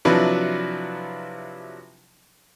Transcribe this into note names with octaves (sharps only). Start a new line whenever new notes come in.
C3 F3 F#3 D4 E4 B4